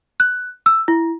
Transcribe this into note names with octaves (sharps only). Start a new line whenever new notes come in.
F#6
E6
E4